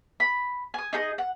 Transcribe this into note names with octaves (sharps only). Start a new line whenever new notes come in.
B5
G#5 D#6
D#4 G#4 A4 D#5
F#5